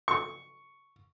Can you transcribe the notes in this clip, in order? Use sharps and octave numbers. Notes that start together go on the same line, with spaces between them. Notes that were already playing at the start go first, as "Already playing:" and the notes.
C#6